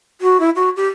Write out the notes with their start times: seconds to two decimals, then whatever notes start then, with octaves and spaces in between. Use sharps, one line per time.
0.21 F#4
0.40 E4
0.56 F#4
0.76 G4